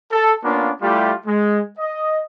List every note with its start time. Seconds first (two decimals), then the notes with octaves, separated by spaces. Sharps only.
0.12 A4
0.44 A#3 B3 C#4 D4 F4
0.82 G3 A3 E4 F4 G4
1.26 G#3
1.79 D#5